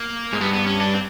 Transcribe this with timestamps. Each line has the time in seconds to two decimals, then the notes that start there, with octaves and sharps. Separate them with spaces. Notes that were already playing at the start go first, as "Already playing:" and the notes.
Already playing: A#3
0.33 G#2
0.41 G2 B3
0.53 B3
0.66 C#4
0.80 D4
0.94 C4